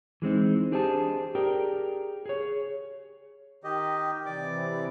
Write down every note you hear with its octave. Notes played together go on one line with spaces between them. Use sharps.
E3 G#3 C4 D#4
D4 G4 G#4 C5 D#5 A5
G4 G#4 A#4 D5 G5
G#4 C#5
D#3 G4 D#5
C3 E3 D5 D6